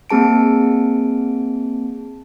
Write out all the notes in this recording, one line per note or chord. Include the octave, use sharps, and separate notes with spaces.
A#3 C4 G#4 A5 D7